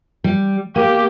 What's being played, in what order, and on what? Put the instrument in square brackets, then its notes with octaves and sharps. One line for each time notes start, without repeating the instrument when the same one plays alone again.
[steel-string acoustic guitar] G3
[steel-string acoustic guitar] A#3 [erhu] G4